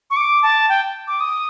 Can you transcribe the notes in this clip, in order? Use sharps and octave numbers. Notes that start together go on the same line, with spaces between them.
C#6
D6
A5
G5
D6
D#6